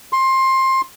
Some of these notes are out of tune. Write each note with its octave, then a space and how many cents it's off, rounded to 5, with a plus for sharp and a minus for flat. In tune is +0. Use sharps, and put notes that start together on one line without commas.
C6 +20